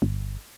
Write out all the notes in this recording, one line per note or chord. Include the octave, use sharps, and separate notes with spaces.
G1